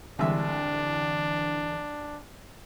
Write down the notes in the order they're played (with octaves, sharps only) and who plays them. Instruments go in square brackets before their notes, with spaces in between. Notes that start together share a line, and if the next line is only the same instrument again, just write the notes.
[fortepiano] C2 G#3 E5 [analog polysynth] D3 E3 [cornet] D4